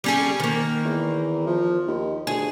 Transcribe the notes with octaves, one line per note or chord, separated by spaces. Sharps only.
G3 C#4 G#4
D#3 A#3
E2
F3
D#2
D2 G#4